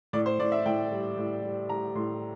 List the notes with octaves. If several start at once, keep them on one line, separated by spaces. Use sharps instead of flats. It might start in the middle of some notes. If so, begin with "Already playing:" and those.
A2 D5
C5
A2 D5
E5
A2 G5
G3
A2
G3
G3 A#5
A2 C6